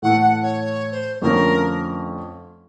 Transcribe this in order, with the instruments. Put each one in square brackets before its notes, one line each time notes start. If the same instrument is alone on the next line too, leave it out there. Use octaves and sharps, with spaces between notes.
[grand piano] A2 E3 A3 [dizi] F#5
[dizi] F#5
C#5
C#5
C5
[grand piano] F2 D3 F3 A3 C#4 [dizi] A#4